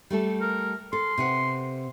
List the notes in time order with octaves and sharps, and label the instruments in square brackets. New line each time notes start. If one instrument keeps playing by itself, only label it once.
[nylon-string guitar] G3 A3 A4
[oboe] A#4
[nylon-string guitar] A4 [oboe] C6
[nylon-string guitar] C3 B4 F#5